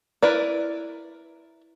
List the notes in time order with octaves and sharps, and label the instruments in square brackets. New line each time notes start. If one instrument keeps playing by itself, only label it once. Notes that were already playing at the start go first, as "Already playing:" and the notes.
[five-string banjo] E4 A#4 B4 D5